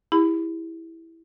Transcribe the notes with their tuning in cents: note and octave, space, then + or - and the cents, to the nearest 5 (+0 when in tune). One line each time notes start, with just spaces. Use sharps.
E4 -5 G4 +35 B5 +20